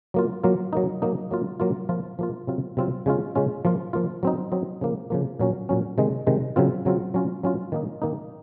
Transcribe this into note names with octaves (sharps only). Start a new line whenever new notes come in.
F#3 A#3 F4
F#3 A#3 F4
F#3 A#3 D#4
F#3 A#3 D#4
F#3 A#3 F4
F#3 A#3 F4
F3 A#3 F4
F3 A#3 F4
C3 F#3 C4 F4
C3 F#3 C4 F4
C#3 G#3 C#4 F4
C#3 G#3 C#4 F4
F3 A#3 F4
F3 A#3 F4
F#3 C4 D#4
F#3 C4 D#4
C#3 F3 A#3
C#3 F3 A#3
A#2 F#3 C#4
A#2 F#3 C#4
C3 D#3 G#3
C3 D#3 G#3
C#3 F#3 C4 F4
C#3 F#3 C4 F4
F#3 C#4 F4
F#3 C#4 F4
D#3 A#3 D#4
D#3 A#3 D#4